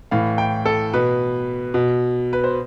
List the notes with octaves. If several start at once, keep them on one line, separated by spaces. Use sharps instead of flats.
A2 E3 F5
G5
A4
B2 B4
B2
B4
C5